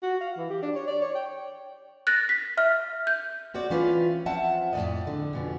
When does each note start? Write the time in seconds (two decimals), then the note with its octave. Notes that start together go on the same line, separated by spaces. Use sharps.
0.03 F#4
0.20 F5
0.37 E3
0.50 G4
0.62 D4
0.75 C#5
0.87 D5
1.01 C#5
1.15 G5
2.07 F#6 A6 A#6
2.29 B6
2.57 E5 F6
3.07 G6
3.54 C4 F#4 C#5 D5
3.70 E3 C4 C#4 F4 B4
4.26 F3 C4 E5 F#5 A5
4.73 F2 A2 B3 D5 D#5
5.07 D3
5.33 F2 B2 C#4